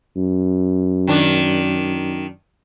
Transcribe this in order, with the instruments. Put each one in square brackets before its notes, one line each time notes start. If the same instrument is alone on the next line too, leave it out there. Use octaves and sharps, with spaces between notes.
[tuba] F#2
[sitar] D#3 D4